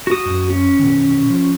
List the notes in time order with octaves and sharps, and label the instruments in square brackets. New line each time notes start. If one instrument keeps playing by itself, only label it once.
[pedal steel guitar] F#4 D#6
[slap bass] F#2
[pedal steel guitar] C#4
[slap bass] B2 D#3 E3
F3